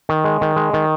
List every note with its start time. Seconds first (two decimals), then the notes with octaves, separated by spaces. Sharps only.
0.09 D#3
0.24 G#3
0.41 D#3
0.56 G#3
0.73 D#3